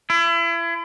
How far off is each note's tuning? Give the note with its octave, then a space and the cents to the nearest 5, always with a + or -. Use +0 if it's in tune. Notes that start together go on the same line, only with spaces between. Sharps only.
E4 +35